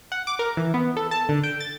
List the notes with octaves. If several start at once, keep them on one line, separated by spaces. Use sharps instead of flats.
F#5
D6
A#4
E3
B3
A4
A5
D3
G5
A6